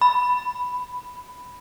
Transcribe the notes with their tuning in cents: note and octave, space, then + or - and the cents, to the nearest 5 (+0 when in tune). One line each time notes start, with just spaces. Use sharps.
B5 +0